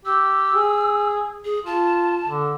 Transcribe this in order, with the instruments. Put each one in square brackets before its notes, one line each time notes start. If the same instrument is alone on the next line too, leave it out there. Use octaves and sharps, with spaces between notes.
[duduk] G4 [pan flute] E6
[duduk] G#4
[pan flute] G#4
[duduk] F4 [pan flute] A5
[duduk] D3